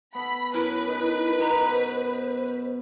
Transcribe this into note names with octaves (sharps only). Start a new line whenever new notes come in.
B3 A4 B5
F#2 E4 A#4 B4
D#4
B2 A#5
C5